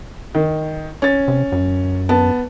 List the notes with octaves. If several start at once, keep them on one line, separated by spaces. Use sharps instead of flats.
D#3
C#4 A6
C3
F#2
B3 A5